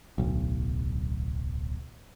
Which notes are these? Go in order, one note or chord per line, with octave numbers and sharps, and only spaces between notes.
D1 B1